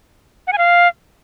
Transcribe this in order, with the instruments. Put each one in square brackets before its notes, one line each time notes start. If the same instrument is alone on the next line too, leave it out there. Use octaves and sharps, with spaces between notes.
[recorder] F#5
G#5
F5